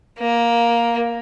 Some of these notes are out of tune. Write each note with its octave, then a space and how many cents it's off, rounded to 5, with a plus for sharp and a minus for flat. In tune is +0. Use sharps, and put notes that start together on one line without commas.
A#3 +10